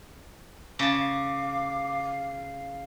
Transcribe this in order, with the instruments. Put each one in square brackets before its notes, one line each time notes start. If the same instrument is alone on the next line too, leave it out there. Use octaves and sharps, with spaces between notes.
[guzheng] C#3 A5 [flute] F5 [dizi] D6